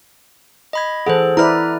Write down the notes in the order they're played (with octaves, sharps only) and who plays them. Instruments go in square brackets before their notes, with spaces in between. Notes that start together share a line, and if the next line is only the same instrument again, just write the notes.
[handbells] D#5 B5 G#6
[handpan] E3 A4 F#5 [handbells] G#4 C5
[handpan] E4 B4 D5 [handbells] A#5 F6